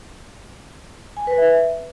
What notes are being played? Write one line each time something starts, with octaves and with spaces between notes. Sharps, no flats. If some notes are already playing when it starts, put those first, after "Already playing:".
G#5
B4
E5